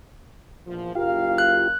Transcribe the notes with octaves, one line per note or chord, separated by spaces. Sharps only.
A#1 E2 F3
F#1 F4 G4 A#4 F5
F#6